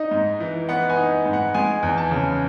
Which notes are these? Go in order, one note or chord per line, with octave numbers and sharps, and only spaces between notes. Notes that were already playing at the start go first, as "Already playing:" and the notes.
Already playing: D#4 D#5
G#2
E3
B3 F#5
G#5
D#4
G#2
F#5
G#3 G#5
E2
A5
C#3